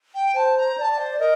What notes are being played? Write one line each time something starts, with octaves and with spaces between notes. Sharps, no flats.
G5
C5 A5
A#5
D5 A5 A#5
C5
A#4 D#5